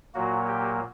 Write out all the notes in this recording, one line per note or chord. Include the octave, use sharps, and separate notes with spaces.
A#2 F#3 A#3 F#4
G4